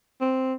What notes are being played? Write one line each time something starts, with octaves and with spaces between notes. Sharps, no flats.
C4